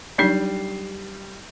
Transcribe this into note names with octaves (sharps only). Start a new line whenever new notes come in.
F#3 G3 D4 D#4 G6 C7